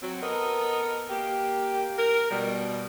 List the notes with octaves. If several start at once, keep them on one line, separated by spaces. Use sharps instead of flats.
F#3 C4
B3 A4 A#4 D#5
A#3 G4
A#4
B2 G3